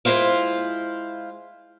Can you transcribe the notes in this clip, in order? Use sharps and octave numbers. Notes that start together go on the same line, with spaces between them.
G#3 E4 F4 C5 F5